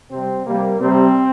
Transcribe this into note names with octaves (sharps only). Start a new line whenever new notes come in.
C3 G3 C4
C3 G3 A#3
C3 G3 C4